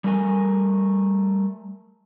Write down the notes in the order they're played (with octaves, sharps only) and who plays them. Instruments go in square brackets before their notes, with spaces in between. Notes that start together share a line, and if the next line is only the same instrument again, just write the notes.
[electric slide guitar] G3 A3 A#4 G#5